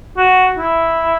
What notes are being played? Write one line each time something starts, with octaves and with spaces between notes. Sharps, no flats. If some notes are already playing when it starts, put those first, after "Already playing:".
F#4
E4